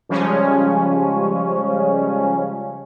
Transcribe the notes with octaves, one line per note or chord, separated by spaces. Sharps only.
C#3 F3 G3 G#3 C#4